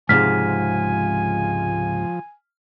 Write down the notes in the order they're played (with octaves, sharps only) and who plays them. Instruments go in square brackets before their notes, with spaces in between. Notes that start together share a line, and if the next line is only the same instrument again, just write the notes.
[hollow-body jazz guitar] C#2 G#2 C3 [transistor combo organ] F3 [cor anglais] G#5 [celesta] F6 B6